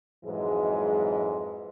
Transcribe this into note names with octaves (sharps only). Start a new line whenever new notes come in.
F2 G#2 E3 F#3 G#3